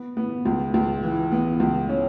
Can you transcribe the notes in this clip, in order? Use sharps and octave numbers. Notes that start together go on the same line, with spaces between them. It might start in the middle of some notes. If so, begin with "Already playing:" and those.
Already playing: B3
B3
C#2
C#2
E3
B3
C#2
C#4